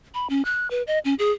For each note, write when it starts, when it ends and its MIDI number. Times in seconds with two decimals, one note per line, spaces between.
0.14 0.27 83
0.30 0.44 61
0.45 0.70 90
0.70 0.83 71
0.87 0.99 75
1.05 1.15 61
1.19 1.31 68